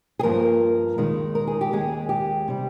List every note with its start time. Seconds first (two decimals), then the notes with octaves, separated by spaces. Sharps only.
0.19 G#4
0.23 G2 F3 A#3 A#4
0.98 D#2 D#3 G#3 D#4
1.35 A#4
1.47 G#4
1.61 G4
1.72 D#2 D#3 G#3 G#4
2.09 G4
2.48 C3 G3